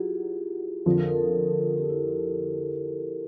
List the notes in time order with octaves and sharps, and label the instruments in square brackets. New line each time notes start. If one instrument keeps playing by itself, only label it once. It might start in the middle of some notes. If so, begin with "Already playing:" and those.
Already playing: [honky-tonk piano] F#3 [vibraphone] E4 F4 G4 G#4
[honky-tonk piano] F2 D3 F3 [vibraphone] A4
[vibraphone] A#4
A4
A#4
A4
G4
E4